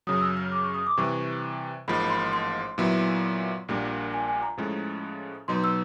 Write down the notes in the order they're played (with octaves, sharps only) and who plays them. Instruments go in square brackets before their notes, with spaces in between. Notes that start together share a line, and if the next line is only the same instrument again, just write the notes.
[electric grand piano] F#2 C#3 F#3 [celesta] D#6
[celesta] E6
F6
D6
C#6
D#6
D6
[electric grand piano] C3 E3 G3 [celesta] C#6
[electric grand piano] A1 G#2 F3 A#3 [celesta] B5
[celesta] B5
C6
C6
[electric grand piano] A#2 F#3 B3 E4
A#1 A#2 G3 A#3 D4
[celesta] G#5
G#5
A#5
[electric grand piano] A2 F3 G#3 C#4
[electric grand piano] B2 F#3 B3 D#4 [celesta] C6
[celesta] E6